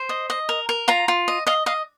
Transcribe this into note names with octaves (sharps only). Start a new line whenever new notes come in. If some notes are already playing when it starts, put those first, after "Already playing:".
Already playing: C5
D#5
D#5
A#4
A#4
F4 A#5
F4
D#5
D#5 F5
D#5 F5